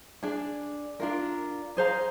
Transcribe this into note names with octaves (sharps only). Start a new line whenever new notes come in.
D4 G#4 D5
D4 F4 A#4
G#4 C5 F5 A#5